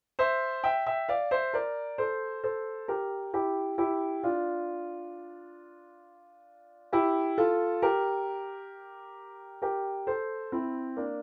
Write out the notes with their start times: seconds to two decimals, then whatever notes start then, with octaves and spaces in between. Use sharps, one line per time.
0.19 C5 E5
0.64 E5 G5
0.87 E5 G5
1.09 D5 F5
1.31 C5 E5
1.53 A#4 D5
1.98 A4 C5
2.44 A4 C5
2.88 G4 A#4
3.33 E4 G4
3.78 E4 G4
4.23 D4 F4
6.93 E4 G4
7.38 F4 A4
7.82 G4 A#4
9.62 G4 A#4
10.07 A4 C5
10.52 C4 E4
10.97 A#3 D4